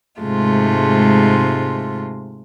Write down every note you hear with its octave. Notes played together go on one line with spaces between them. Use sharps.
G#2 C3 G#3 A3 F4